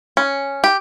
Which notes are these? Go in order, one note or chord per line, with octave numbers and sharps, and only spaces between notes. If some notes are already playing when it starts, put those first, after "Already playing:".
C#4
G4